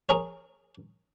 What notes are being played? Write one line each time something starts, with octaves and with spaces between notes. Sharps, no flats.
G#4 A#4 C#5